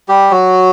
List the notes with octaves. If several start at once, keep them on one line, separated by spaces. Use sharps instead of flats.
G3 G4
F#3 F#4